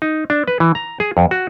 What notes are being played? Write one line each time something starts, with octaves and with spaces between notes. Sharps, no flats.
D#4
D4
B4
E3
A#5
G#4
F2
F#4